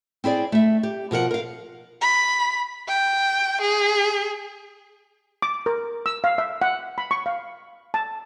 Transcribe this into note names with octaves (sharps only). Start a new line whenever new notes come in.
C4 E4 G#4 D5
A3 E5
G4
B2 F3 A#4 F#5
A#4 F5
B5
G5
G#4
D6
A#4
E6
F5
E5
F#5
B5
C#6
F5
A5